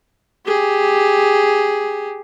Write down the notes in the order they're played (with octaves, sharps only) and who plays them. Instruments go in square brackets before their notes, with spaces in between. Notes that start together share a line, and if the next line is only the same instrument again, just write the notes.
[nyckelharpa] G4 G#4